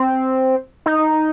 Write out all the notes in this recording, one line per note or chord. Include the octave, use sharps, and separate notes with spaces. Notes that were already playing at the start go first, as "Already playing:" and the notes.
Already playing: C4
D#4